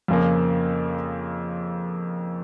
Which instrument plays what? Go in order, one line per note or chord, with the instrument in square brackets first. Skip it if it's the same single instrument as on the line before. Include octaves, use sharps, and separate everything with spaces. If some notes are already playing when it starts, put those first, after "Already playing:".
[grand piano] F2 C#3 F3 A#3